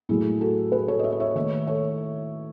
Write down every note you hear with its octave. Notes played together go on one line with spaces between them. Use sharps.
A2 F#3 A3 E4 G#4
F#4 A4
G#4 B4
A4 C#5
D#5
C#5 E5
D#5
C#5 E5
D#3 A3 C#5 E5
A4 C#5